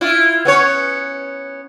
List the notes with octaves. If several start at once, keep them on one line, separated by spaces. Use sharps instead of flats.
E4 F4
B3 C#4 C#5